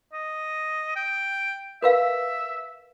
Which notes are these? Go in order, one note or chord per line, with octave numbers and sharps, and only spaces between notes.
D#5
G5
A#4 B4 E5 F5